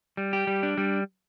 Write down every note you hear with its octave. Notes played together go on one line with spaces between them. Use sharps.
G3
G4
G3
D4
G3